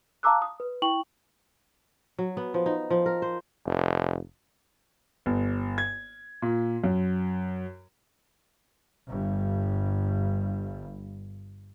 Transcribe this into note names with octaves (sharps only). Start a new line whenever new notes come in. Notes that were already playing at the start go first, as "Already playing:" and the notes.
F5 A5 A#5 D6 E6 F#6
D#6
B4
E4 G5 C#6 F#7
F#3
B3
F3
D#4
F3
A#4
C5
F1
G1
G#6
A#2
F#2
G1 G2